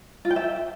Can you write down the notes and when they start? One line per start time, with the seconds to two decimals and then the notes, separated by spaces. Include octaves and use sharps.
0.25 F4
0.30 G5
0.36 E5